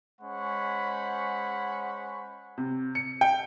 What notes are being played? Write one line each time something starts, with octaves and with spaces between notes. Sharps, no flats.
G#3 C#4 C5 F#5 B5 C#6
C3
C#7
G5